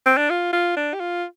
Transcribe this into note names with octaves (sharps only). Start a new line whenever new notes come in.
C4
D4
F4
F4
D4
G4
F4